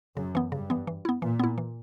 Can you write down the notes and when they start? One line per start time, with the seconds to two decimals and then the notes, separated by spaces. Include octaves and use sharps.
0.17 F#2 C#3
0.35 E3 B3
0.52 G2 C#3
0.70 E3 B3
0.87 E3
1.05 B3 E4
1.22 A#2 E3
1.39 B3 E4
1.58 E3